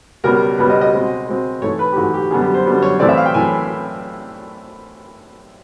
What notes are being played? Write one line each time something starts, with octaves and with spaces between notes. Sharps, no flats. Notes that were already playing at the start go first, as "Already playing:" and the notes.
C#2 B2 G3 B3 A#4
C#2 B2 G3 B3 B4
D#5
D#5
B2 G#3 C4
B2 G#3 C4
G#2 E3 A3 C#5
B4
G4
G#2 E3 A3 F#4
G4
F#2 D3 G3 B3 G#4
G4
C5
F#2 D3 G3 B3
C#5
A2 E3 A3 C4 D5
E5
F5
G5
A2 E3 G#5